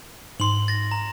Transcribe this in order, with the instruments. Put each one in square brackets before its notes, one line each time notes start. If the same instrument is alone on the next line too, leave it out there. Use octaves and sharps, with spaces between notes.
[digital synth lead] G#2 [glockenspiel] C6 F#7
[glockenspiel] A6 A#6
A#5